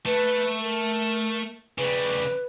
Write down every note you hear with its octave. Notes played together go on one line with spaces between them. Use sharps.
A3 B4
A#4
C#3 G3 B4